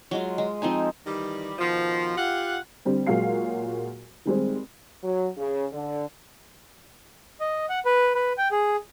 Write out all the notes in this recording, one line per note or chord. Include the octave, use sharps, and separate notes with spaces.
F#3 G#3 F4
G#3
F3 C4 D#4 G#5
D#3 E3 G3
B2 D#3 F3
F4 G4 F#5
D3 G3 C4
A#2 F#3 G#3 F#4 F5 C7
D#3 G3 G#3 C4
F#3
C#3
D3
D#5
F#5
B4
B4
G5
G#4